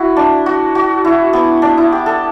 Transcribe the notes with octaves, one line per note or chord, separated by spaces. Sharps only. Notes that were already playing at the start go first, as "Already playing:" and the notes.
Already playing: E4 F#4
D4
F#4
F#4
E4
B3
D4
E4
G4
A4